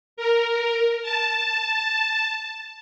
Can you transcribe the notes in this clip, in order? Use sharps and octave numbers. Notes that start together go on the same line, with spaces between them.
A#4
A5